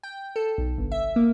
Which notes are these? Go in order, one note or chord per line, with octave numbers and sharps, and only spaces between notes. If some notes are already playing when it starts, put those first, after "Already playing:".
G5
A4
B1
G1
E5
A#3